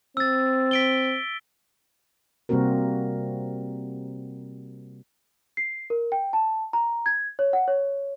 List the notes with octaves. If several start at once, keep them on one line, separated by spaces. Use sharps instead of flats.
C4 E6 A6
B6 D7 G7
C3 G3 A#3 C4 F#4 A#4
C7
A#4
G5
A5
A#5
G#6
C#5
F#5
C#5